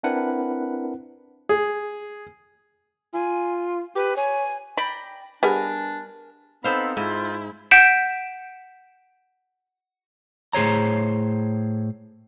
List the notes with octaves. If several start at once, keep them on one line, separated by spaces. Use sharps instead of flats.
C4 D4 E4 A#4 B4 F#5
G#4
F4 G#5
G4 B4
C#5 G#5
D5 G5 A#5 B5
G3 B3 D4 G#4 A#4 G#5
B3 C4 D#4 A4 C5 F5 B5
G#2 E4 F4 G6
F#5 G6 B6 C#7 D7 E7
A2 G#4 C5 C#5 A#5